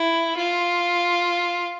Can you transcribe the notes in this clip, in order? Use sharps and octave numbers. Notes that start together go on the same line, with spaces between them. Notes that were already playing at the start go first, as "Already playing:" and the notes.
Already playing: E4
F4